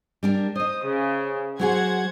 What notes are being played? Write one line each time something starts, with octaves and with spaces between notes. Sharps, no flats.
G3 D4 A#4
C5 D#5 D#6
C#3
F#3 F#4 G#4 C5 F#5 G#6